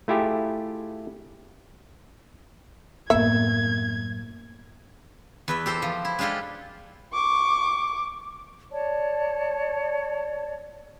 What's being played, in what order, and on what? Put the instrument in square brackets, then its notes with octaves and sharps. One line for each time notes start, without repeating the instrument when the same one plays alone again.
[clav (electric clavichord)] A3 E4 F4 G4 G#4
[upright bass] F#2 A2 [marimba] A#3 B3 A#4 [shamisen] E5 [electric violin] G#6
[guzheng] E2 B4 E5
G4 A4 C5 E5
F3
E4
G#3 D4 F4 G4 A4
[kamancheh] C#6 D6
[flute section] C#5 D5 A5